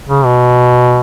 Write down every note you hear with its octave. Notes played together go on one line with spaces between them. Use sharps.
C#3
B2